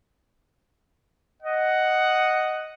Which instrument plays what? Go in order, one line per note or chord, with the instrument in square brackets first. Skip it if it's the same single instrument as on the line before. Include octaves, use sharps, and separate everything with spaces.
[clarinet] D#5 [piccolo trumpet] F#5